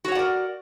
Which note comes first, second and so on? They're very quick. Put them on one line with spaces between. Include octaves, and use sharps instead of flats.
F#4 C#5 F#5 D5 A#4